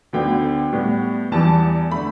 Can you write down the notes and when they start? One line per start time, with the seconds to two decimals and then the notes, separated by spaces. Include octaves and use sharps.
0.13 D2 D3 B3 G5
0.73 A2 G3 B3
1.32 E2 E3 G3 B3 A5
1.91 D3 A3 B5